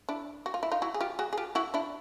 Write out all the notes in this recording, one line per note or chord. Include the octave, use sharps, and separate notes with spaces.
D4 E4
F#4
F4
E4
D#4 F4
E4 F#4
G#4
F4 G4
F#4 G#4
G#4
F4 G4
E4 F#4
D4 E4